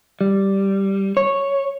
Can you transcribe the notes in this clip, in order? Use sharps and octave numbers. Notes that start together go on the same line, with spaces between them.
G3
C#5